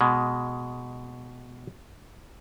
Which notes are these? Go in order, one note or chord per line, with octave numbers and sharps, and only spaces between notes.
B2 G#3